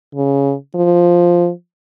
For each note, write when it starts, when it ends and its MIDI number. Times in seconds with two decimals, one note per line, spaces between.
0.15 0.53 49
0.75 1.50 53